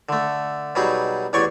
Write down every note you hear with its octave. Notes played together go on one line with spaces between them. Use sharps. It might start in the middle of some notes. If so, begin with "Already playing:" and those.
D3 A3
B2 F#3 G3 D#4 G#4
A1 E2 C#5 D5 G#5 C#6